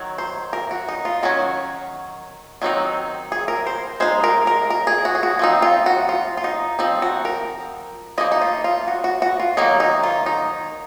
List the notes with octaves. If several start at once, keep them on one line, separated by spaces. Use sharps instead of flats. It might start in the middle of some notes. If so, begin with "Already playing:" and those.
Already playing: D#3 F#3
C5
A#4
F#4
D#4
F4
D#3 F#3 C#4 F#4
D#3 F#3 C4 D#4
G#4
A#4
C5
G#3 D#4 C5
A#4
A#4
A#4
G#4
F#4
G#4
F#4
F3 C4 D#4
F4
F#4
F4
F4
D#4
F3 C4 D#4
F#4
A#4
F3 A#3 D#4 D#5
D#4
F4
F4
F#4
F#4
F#4
F4
D#3 F#3 A#3 D#4
D#4
F4
D#4